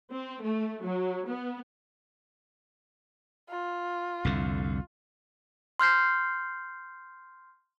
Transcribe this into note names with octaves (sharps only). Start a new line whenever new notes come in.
C4
A3
F#3
B3
F4
C2 F2 D3
C6 F6 G6 C7